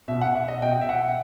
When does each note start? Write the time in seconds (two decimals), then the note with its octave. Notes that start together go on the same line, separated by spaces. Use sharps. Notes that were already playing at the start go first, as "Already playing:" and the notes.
0.08 B2 E5
0.21 F#5
0.35 E5
0.48 D#5
0.62 B2 G5
0.81 E5
0.89 F#5